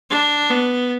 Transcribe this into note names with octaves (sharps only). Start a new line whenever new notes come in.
D4
B3